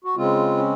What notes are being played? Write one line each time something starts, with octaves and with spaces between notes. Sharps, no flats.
F#4
C#3 G#3 C4 F4
C#4